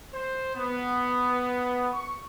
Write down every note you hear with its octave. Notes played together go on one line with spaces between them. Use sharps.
C5
B3
C#6